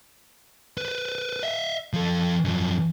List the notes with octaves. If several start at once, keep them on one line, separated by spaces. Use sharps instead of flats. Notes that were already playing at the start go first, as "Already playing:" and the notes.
B4 C5
D#5 E5
F3 A4
F#2 F3